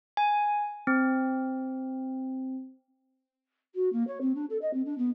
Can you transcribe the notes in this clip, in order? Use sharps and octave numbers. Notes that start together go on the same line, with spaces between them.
G#5
C4
F#4
A#3
C#5
C4
D4
A4
D#5
C4
D4
B3